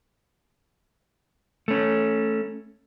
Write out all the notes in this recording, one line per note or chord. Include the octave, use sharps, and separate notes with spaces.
A3 C#4